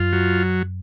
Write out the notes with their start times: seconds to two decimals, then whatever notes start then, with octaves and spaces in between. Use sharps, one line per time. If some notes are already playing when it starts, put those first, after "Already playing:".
Already playing: F#2 F4
0.13 F#3